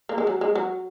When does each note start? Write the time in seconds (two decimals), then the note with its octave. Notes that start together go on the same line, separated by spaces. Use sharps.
0.09 A#3
0.18 G#3
0.27 F#3
0.41 G#3
0.55 F#3